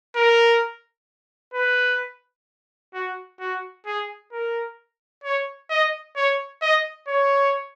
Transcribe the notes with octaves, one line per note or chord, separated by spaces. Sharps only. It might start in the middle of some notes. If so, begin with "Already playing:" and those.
A#4
B4
F#4
F#4
G#4
A#4
C#5
D#5
C#5
D#5
C#5